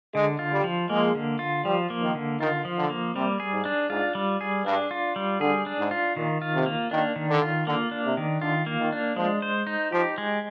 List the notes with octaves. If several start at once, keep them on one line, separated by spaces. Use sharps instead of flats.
D3 G#3
F4
G3
F3
G#3 A#3
D3
F4
F3 G3
A#3
D#3
D3
D#3 F4
F3
D3
A#3
C3 G3
G#4
G#2
D4
G#2 F4
G3
G#4
G2 D4
F4
G3
D3 G#4
D4
G#2
F4
A#2 D#3
F4
C3
A#3
D#3 D4
D#3
D3
F4
D3 A#3
D4
C3
D#3
D3 F4
A#3
D#3
D4
F3 G#3
C5
D#4
F3 G4
G#3